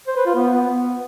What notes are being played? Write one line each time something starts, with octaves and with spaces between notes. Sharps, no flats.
C5
B4
F4
B3